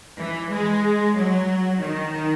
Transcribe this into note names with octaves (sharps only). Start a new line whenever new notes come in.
E3
G#3
F#3
D#3